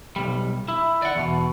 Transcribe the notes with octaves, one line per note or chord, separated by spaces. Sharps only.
B1 G3
E4
D5 F#5
E2 B2